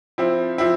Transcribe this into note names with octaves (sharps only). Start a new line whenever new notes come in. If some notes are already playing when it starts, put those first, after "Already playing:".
F3 C4 E4
F3 C4 E4